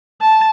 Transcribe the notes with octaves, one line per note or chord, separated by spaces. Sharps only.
A5